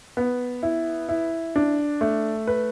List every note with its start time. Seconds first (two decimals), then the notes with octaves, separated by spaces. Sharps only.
0.17 B3
0.63 E4
1.09 E4
1.56 D4
2.01 A3
2.47 B4